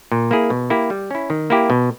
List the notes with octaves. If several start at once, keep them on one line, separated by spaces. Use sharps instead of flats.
A#2
A#3 E4 G#4
B2
A#3 E4 G4
G3
C#4 E4
D#3
A#3 E4 G4
B2